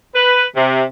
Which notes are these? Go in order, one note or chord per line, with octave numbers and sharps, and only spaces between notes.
B4
C3